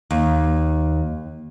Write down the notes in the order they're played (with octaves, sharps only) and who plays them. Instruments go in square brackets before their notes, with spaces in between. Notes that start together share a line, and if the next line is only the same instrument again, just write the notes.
[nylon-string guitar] D#2